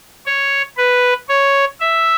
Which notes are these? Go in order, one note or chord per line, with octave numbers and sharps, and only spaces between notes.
C#5
B4
C#5
E5